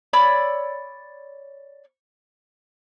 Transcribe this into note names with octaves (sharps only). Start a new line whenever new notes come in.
C#5 D5 B5 E6